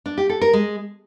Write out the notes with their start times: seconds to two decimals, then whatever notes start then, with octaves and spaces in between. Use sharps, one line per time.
0.06 D4
0.18 G4
0.30 A4
0.41 A#4
0.53 G#3